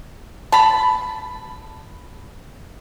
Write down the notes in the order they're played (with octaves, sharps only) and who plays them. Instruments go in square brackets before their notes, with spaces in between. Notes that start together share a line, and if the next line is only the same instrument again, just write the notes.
[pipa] A5 B5